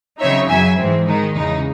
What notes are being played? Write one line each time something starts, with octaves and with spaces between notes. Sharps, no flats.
C#3 F#3 C4 D#4 C#5 E5
F#2 C#3 F#3 E5 G#5
G#2 E3 G#3 C4
D#3 G#3 D#4
E2 C#3 G#3 D#4